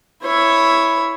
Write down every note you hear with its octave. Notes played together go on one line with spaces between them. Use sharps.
E4 C#5